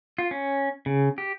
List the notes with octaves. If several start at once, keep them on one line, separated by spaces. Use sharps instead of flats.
F4
C#4
C#3
G4